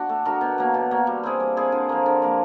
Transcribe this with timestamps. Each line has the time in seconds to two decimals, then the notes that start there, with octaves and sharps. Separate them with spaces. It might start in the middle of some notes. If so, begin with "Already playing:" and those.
Already playing: D4 F#4
0.09 A3
0.25 D4 F#4 A#4
0.41 B2
0.58 F#3 A#3
0.74 B2
0.91 F#3 A#3
1.07 G3
1.23 C4 E4 G#4
1.40 G3
1.57 C4 E4 G#4
1.72 D3
1.89 F3 A#3
2.06 D3
2.22 F3 A#3